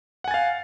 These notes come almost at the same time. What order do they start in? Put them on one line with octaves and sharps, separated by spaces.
F#5 G#5 A6 F5